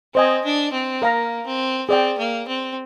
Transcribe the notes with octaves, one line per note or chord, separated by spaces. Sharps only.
C4 C5 D#5 G#5
D4
C4
A#3 A#4 F5 A#5
C4
C4 G#4 D5 G5
A#3
C4